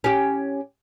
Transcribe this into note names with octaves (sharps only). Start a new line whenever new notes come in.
C#4 G4